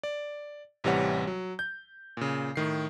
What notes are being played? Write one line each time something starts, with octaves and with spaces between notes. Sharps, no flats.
D5
A1 C3 E3 G3 C#5 F#5
F#3
G6
A#2 C#3
A2 D#3 C7